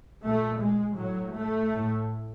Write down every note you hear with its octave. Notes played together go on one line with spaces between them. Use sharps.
A#2 A3
G#3
A2 F#3
A3
A2